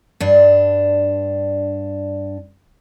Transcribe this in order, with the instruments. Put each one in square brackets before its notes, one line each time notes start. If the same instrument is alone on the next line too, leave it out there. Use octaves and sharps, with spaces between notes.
[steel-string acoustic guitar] G2 D4